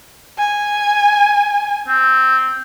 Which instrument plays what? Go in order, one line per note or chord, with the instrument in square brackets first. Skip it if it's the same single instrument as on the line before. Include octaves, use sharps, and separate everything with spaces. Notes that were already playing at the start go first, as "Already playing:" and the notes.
[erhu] G#5
[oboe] C4